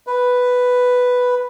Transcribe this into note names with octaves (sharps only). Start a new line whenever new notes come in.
B4